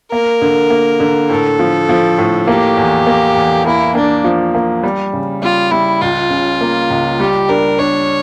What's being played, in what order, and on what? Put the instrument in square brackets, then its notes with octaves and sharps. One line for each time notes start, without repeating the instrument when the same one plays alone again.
[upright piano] A#3 [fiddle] A#4
[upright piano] D3
A#3
D3
[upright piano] A2 [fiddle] A4
[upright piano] F3
F3
A2
[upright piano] A#3 [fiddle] G4
[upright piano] E2
A#3
E2
[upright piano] A#3 [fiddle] E4
[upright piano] A#3 [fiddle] D4
[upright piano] F3
A#3
G3
C#3
[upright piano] G3 [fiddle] F4
[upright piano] G3 [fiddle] E4
[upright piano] C#2 [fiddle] F4
[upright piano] C#3
A#3
C#2
[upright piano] G3 [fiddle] G4
[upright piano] D4 [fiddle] A#4
[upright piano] D4 [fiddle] C#5